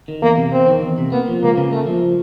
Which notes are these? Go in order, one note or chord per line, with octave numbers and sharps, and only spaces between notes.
D#3
E2 A#3
C3
E2 C4
D#3
E2
C3
A#3 B3
F3
C#2 A#3
C#3
A3 A#3
F3